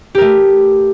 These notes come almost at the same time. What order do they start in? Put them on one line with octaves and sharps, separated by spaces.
G4 A#4 A3